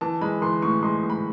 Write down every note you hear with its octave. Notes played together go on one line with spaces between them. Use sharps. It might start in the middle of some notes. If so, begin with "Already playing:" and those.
E3 A5
G#3 B5
E3 C6
A2 C#6
G#3 C6
A2
B5